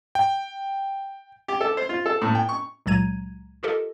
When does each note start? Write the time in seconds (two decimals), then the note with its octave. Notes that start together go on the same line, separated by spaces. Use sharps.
0.15 G5
1.48 G4
1.61 A4
1.77 C5
1.89 F4
2.06 A4
2.22 A2
2.35 G5
2.49 C#6
2.86 C#2 A#2 F#3 A#5 G#6 D#7
3.63 F4 G4 A4 A#4 D#5